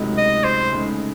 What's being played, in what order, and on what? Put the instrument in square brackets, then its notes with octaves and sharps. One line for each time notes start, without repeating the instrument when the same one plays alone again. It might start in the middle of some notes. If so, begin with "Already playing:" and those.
Already playing: [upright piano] C#2 C3 F#3 A3 D#4
[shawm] D#5
C5
[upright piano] C#2 C#3 A3 D#4